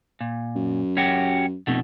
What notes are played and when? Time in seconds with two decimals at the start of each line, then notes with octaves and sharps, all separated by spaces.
0.21 A#2
0.56 F#2
0.97 C#4 F#4 G4
1.67 F1 B2 A3